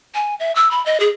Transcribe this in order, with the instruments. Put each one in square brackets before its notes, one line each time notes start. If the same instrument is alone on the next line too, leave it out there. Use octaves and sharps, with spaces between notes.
[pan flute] G#5
E5
E6
B5
D#5
G#4